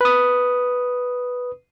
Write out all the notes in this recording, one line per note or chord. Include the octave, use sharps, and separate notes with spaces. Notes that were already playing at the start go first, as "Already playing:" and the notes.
B4 D#6